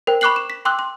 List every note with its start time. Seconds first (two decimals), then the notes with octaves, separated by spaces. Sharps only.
0.07 A#4 C5 G5
0.21 B5 C#6 D6 F#6 C7 F#7
0.36 E7
0.50 B6
0.65 G5 C6 D6 E6 F#6
0.79 C6